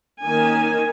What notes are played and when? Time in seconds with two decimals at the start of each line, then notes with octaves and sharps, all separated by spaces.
0.23 D#3 A#3 C#4 G#5